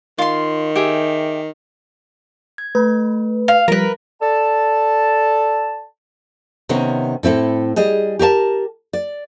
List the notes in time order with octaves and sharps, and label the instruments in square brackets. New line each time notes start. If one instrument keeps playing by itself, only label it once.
[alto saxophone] D#3 [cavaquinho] F4 C6
[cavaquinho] G4 G#4 E5
[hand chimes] G#6
[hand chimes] A3 [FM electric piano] B4
[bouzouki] F5
[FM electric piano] F3 G3 [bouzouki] A#4 B4 [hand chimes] A#6
[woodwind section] A4 D5 A5
[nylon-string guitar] C3 D#3 B3 C#4
A2 C4 E4 A4
G3 G#4 D#5
G4 A#4 C#5 A5
D5